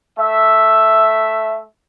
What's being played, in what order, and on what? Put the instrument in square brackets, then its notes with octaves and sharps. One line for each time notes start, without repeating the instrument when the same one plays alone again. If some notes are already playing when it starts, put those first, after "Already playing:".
[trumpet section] A3 E5